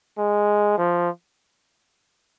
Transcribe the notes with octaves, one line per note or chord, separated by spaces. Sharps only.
G#3
F3